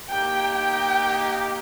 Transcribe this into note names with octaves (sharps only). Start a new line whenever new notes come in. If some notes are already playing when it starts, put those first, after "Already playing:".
A#3 D#4 G4 G5
G5